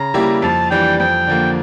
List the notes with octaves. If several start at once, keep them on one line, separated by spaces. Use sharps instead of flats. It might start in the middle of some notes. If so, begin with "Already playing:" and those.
Already playing: C#3 A#5
G3 A#3 E4 G4
F2 A5
E3 G3 D4 G5
F2 G5
D3 F3 A#3